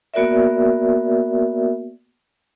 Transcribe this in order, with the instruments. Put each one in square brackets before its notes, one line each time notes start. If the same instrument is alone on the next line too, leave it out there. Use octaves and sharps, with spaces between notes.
[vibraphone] A#3 B3 F#4 A#4 D5 E5